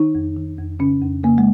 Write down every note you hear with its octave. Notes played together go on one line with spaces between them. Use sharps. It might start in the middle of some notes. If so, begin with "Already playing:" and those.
Already playing: D#3 D#4
F2
D#3
F2
C#3 C#4
F2
C#3 A#3
G#3